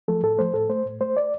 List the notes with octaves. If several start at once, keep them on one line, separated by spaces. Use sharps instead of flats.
F3 A3 A4
A2 A4
F3 A3 C5
A2 A4
A3 C5
A2
A3 C5
D5